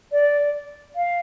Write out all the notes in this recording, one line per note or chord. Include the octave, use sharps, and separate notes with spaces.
D5
F5